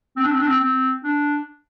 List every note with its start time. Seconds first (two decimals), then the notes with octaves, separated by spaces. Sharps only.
0.17 C4
0.24 D4
0.32 C4
0.39 D4
0.47 C4
0.60 C4
1.04 D4